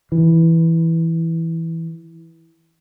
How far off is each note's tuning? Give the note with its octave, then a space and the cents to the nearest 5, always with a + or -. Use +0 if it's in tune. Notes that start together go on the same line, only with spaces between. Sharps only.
E3 -5